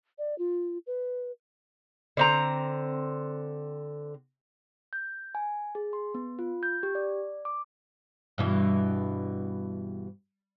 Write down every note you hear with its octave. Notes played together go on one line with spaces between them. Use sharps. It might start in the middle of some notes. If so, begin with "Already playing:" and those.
D5
F4
B4
D3 C4 A#5
G6
G#5
G#4
C6
B3
F4
G6
G4
D5
D6
G2 B2 E3